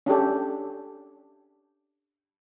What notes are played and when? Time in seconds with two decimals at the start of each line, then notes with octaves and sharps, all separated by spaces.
0.06 C#4 D4 G4 A4